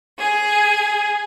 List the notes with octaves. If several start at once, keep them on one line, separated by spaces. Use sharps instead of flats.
G#4